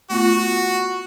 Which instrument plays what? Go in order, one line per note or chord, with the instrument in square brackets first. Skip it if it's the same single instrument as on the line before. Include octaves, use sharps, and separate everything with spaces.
[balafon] A3 B3 F4 [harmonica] F#4